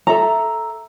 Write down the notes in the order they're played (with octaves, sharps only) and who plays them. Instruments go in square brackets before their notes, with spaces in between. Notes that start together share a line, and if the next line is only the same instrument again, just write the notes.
[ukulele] A4 E5 A#5